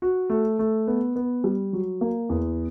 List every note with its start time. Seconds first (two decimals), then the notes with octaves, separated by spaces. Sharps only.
0.02 F#4
0.30 A3
0.59 A3
0.87 B3
1.16 B3
1.44 G3
1.73 F#3
2.01 A#3
2.29 E2